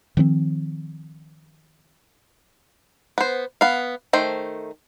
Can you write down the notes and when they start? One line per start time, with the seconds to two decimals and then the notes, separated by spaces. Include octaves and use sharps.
0.17 D#3 F3 B3 C4
3.18 B3 C5
3.61 B3 F5
4.13 D#3 A3 C5